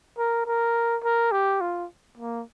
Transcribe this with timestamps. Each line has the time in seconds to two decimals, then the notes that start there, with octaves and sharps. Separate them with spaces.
0.18 A#4
0.46 A#4
1.04 A#4
1.32 G4
1.61 F4
2.17 A#3